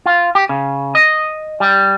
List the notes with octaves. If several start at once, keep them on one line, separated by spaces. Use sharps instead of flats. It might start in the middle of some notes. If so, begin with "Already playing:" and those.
F4
G4
C#3
D#5
G3